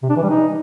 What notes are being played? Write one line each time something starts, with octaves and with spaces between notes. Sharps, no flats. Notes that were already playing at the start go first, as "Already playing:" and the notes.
C3
D4
E3
G3
D#4